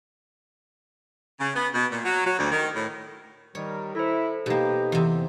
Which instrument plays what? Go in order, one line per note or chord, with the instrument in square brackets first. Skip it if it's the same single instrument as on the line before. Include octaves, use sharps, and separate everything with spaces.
[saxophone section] C#3
B3
B2
A#2
F#3
F#3
D2
D#3
A2
[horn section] D#3 G3 A#4 [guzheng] C#5
[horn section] E4 [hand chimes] A4 C5
[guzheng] B2 A#3 [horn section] D#4 [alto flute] G4
[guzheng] E2 C3